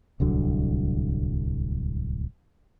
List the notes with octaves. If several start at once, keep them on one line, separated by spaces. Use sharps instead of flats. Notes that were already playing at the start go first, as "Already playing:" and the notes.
D1 C2 D3 F#3